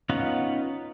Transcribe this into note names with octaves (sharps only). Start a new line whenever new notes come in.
B3 C#4 D#4 F4 F#5